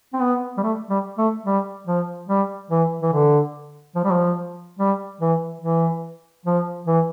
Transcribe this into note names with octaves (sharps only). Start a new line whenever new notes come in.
C4
B3
G3
A3
G3
A3
G3
F3
G3
E3
E3
D3
F3
G3
F3
G3
E3
E3
F3
E3